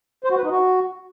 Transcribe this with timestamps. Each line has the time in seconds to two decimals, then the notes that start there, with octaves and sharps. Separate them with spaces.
0.24 C5
0.31 F#4
0.37 B4
0.44 D#4
0.50 F#4